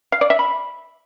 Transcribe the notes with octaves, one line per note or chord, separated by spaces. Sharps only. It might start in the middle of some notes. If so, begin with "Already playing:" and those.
F5
D5
E5
B5